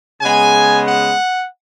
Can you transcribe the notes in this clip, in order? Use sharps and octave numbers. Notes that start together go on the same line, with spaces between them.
C#3 G#3 B3 G#5
F#5